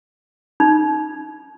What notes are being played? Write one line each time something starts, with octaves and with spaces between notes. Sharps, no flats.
D#4